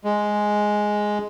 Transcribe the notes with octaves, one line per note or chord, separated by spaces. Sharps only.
G#3